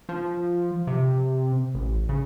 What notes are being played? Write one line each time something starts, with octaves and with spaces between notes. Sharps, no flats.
F3
C3
A1
C#3